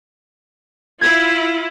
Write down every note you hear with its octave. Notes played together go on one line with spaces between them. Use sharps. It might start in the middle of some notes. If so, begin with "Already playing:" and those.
E4 F4 G#6